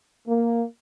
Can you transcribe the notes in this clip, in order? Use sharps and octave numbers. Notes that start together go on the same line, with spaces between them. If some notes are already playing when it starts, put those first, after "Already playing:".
A#3